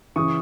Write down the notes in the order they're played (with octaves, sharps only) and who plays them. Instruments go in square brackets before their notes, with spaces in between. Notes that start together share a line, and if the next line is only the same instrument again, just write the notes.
[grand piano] C#3 E3 C#6 D#6